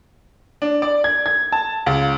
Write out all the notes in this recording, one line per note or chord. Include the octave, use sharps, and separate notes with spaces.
D4
D5
G#6
G#6
A5
C#2